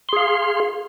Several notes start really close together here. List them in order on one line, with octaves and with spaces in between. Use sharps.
C6 G#4 F5